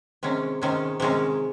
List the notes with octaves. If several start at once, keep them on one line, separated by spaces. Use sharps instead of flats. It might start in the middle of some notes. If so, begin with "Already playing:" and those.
C3 D#3 G#3 C#4
C3 D#3 G#3 C#4
C3 D#3 G#3 C#4